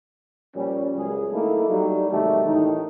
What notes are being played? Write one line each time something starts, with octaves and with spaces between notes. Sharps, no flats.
A#2 F3 G3 C#4
C#2 F#2 G#4
A3 A#3 D#4 E4 A4
F#3 G3 D#4
G#2 C3 D#3 A3 A#3 G4
A1 A2 D#3 D#4